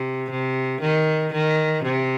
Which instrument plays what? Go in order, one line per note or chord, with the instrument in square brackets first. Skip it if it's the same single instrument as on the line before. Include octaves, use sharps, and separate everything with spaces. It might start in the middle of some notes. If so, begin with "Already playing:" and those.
Already playing: [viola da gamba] C3
C3
D#3
D#3
C3